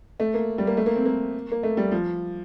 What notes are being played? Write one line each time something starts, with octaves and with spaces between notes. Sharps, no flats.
A3
A#3
G3
A#3
A3
A#3
C4
A#3
A#3
A3
G3
F3